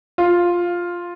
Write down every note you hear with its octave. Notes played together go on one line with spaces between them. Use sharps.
F4